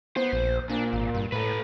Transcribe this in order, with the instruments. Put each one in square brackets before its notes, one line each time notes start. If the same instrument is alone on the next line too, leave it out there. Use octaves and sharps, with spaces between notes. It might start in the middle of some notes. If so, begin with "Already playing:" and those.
[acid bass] B3 [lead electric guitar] C5
[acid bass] A#1
[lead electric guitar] A#2 [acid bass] D4
[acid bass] G#1
G2
[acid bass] A2 [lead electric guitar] A4 B4